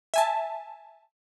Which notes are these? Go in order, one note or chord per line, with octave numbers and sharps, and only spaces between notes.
E5 G#5 A5